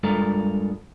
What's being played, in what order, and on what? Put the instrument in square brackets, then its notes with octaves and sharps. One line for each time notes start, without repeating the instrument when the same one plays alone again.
[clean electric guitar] G2 G#3 F4 A4 A#4 D5